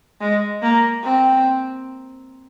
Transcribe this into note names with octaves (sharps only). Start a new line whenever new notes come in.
G#3
A#3
C4